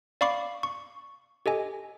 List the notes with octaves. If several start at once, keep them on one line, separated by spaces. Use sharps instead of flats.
D5 F5 B5 C#6 D6 C7
C#6
G4 A4 D#5 G#5